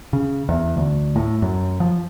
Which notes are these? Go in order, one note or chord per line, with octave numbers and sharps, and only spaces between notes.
C#3
E2
D2
A2
F#2
F3